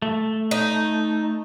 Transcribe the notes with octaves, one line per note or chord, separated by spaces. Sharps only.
A3
D#4